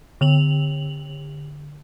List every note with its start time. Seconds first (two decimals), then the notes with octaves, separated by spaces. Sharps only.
0.21 D3 F7 F#7